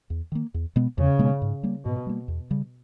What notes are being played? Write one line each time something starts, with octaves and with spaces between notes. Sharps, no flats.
E2
D#3 A#3
E2
B2 G#3 B3
E2 C#3
B2 G#3 B3
G#2
G3 A#3
G#2 B2
G3 A#3
E2
C#3 G3